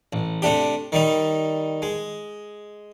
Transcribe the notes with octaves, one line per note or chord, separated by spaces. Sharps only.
A1
C3 A3 D4 G4
D#3 G3 D#4
G#3